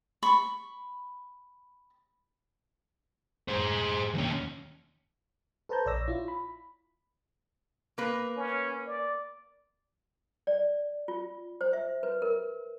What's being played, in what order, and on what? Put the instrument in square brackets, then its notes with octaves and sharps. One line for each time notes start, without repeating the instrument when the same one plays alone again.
[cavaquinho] B5 C#6
[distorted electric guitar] G#4 C5
D#2 C#4
[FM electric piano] A4 B4 C5 A5 A#5 G6
A#1 C#5 D5 E6 A#6
E4 F4
B5
[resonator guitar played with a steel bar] A#3 B4
[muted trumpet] C#4
D5
[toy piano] D5
F4
C5
E5
B4
A#4